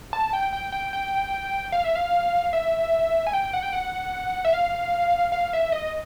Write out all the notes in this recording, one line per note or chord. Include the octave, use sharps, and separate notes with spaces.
A5
G5
G5
G5
G5
F5
E5
F5
E5
G#5
G5
F#5
G5
F#5
E5
F5
F5
E5
D#5